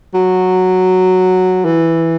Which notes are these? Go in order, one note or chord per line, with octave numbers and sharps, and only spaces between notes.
F#3
E3